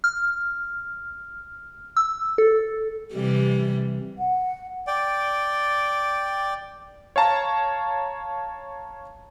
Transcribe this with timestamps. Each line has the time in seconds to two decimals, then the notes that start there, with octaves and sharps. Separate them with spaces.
0.04 F6
1.97 E6
2.38 A4
3.13 C3 E3 G3
4.18 F#5
4.87 D5 G5
7.16 C#5 F5 A5 A#5